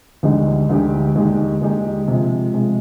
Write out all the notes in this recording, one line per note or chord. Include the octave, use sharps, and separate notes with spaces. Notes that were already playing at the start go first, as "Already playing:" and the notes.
D2 D3 G#3 D#4 G4
D2 D3 G#3 D#4 G4
D#2 D3 G#3 D#4 G4
D#2 D3 G#3 D#4 G4
C3 F3 G#3
C3 F3 G#3